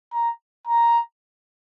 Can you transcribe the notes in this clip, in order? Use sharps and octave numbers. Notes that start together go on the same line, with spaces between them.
A#5
A#5